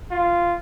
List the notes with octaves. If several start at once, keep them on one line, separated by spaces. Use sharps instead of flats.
F4